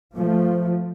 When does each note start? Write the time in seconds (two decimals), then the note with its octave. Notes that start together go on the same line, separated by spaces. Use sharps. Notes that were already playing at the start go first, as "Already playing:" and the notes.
0.14 F3 A3